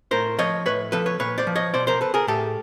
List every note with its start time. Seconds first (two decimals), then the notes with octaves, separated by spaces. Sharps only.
0.11 A2 A#4 C5
0.38 F3 C#5 D#5
0.66 A2 B4 C#5
0.92 F3 A4 B4
1.06 B4 C#5
1.19 A#2 B4 C#5
1.38 C5 D5
1.47 F3
1.56 C#5 D#5
1.74 B2 C5 D5
1.87 A#4 C5
2.01 A4 B4
2.14 G#4 A#4
2.27 A2 G4 A4